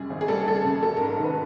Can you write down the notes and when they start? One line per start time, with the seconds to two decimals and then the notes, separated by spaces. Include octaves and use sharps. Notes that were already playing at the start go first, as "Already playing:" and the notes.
Already playing: F#2 G3 G#3 G#4
0.10 G#1
0.21 G#4
0.28 G3 A4
0.46 G3 A4
0.56 G#4
0.64 F#2
0.82 F#3 A4
0.97 G#2 A#4
1.10 A#4
1.19 D#3 B4